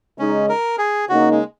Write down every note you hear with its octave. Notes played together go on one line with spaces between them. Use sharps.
C#3 G#3 C#4 D#4
A#4
G#4
C#3 A#3 D#4 F#4
G#3